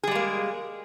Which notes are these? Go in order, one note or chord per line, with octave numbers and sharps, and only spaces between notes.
G3 G#3 A#3 G#4